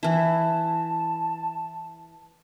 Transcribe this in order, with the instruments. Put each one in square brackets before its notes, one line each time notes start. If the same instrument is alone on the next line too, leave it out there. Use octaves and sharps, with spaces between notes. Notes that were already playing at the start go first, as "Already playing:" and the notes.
[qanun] E3 E4 [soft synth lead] A5